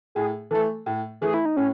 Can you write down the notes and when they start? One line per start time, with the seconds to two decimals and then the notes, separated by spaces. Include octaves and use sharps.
0.15 A2 G#4
0.51 E3 A3 A4
0.86 A2
1.21 E3 A3 G#4
1.34 E4
1.45 D#4
1.57 A2 C#4